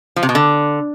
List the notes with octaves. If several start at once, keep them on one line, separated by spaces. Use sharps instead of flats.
F3
C3
B2
D3